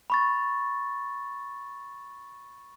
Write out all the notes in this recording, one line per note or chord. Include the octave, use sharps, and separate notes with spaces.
B5 C#6 A6